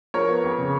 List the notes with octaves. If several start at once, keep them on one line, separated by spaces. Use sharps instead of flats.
F3 A#4 C#5
B3
F2
C#3